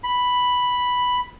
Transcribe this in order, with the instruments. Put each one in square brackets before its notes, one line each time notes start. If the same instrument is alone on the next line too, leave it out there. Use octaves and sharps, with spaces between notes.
[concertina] B5